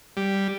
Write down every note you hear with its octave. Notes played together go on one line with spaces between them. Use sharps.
G3